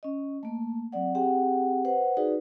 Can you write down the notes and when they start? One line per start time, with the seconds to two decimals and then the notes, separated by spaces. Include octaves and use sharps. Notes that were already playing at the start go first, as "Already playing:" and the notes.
0.03 C#4 D#5
0.43 A3 A#3
0.92 F#3 C4 D5 F#5
1.15 C4 G4 G#4 F#5 G5
1.85 B4 C5 F#5
2.17 D#4 F#4 G#4 B4 D5